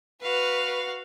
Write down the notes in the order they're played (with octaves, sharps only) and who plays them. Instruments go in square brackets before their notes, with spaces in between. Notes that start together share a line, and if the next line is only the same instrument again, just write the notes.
[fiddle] F#4 F5 [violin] B4